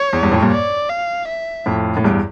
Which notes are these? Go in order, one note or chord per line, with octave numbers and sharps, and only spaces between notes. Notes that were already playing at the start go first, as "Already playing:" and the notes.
Already playing: C#5
E2
E2 G2
F2 A2
G2 A#2
D5
F5
E5
F2 A2
A2
E2 G2